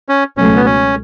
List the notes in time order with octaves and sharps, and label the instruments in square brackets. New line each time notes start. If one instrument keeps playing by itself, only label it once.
[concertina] C#4
[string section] C#2 B2 F#3 A3 [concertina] C#4
[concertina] B3
C#4